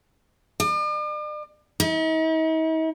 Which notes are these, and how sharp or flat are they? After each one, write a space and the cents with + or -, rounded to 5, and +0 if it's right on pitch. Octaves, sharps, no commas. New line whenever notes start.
D5 +45
D#4 +45